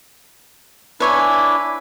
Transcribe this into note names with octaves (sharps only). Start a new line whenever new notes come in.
D4 E4 B4 C#5 G#5